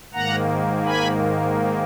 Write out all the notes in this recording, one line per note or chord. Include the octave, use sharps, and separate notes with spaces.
G#2 D#3 A#3 F#5 A#5
G#5 B5